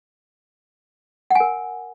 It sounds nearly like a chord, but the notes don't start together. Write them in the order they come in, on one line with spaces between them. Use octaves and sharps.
F#5 G#5 A#4